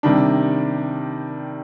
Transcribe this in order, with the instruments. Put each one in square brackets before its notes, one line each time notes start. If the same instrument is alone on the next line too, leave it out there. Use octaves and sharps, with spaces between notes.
[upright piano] C3 D#3 G3 D4